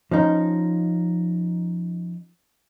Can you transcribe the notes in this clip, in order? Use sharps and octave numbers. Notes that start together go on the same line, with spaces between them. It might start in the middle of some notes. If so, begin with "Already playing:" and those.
F3 C#4 D#4